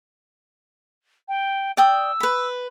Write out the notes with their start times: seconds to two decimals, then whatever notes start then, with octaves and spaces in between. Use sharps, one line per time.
1.28 G5
1.77 D5 G5 D#6 E6
2.20 B4 B5